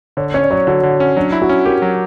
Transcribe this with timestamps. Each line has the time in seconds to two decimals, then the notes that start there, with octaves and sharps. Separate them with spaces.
0.17 D3 C#5
0.34 C#4 C#5
0.43 D5
0.51 F#3 C#5
0.67 D3 F#4
0.83 D3
1.00 C#4
1.17 F#3 D4
1.32 E4
1.42 F#4
1.49 C#4
1.65 G4 A#4
1.82 F#3